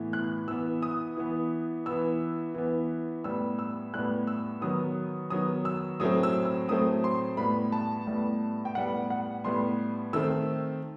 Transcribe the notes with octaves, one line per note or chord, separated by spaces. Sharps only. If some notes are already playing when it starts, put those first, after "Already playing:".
Already playing: A2 E3 B3
F#6
E3 B3 E6
D#6
E3 B3
E3 B3 E6
E3 B3
A2 G3 B3 E6
E6
A2 G3 B3 F#6
E6
D#3 F#3 B3 D#6
D#3 F#3 B3 D#6
E6
A2 F#3 A3 C4 D#6
E6
E6
A2 F#3 A3 C4 D#6
C6
A2 G3 B3 B5
A5
A2 G3 B3
G5
A2 G3 B3 F#5
F#5
A2 G3 B3 C6
D#3 A3 C4 E6